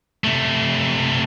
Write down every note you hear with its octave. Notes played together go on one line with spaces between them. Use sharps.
C3 A3